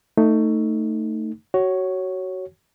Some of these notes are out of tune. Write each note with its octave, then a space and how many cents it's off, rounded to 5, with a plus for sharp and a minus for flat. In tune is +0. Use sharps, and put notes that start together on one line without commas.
A3 +20 D#4 +0
F#4 +20 C#5 +0